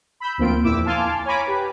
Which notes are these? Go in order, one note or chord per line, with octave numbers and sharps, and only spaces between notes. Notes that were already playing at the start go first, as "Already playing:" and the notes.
B5 E6 G6
D2 F3 A#3 C4 F4 D7
E2 A#2 E4 D6 E6
F5 G#5 A5 C6 D6 F6
C#5 G#5 A#5 B5 D6
G4 B4